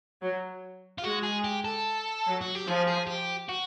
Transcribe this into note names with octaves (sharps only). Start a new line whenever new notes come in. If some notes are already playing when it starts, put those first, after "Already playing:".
F#3
F4
G#3 F#4
G#4
G4
A4
F#3
F#4
G4
F3 G#4
G#4
G4
F#4